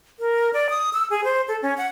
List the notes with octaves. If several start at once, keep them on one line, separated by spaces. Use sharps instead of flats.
A#4
D5
D#6
E6
G#4
C5
A4
C#4
F#5